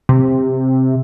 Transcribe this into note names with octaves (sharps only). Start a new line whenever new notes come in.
C3